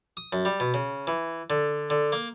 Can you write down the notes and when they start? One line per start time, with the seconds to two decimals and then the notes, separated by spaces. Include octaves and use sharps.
0.17 D#6
0.33 F#2
0.45 G3
0.60 B2
0.74 C#3
1.07 E3
1.50 D3
1.90 D3
2.12 A#3